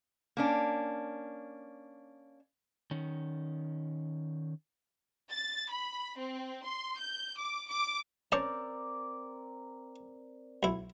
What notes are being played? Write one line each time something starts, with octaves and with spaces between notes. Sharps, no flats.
A#3 C#4 D4
D#3 C#4
A6
B5
C4
C6
G6
D6
D6
C4 C#4 A#4 C5 D5 A5
B1 E4